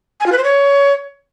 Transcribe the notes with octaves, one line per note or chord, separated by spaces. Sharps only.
G#5
F4
B4
C5
C#5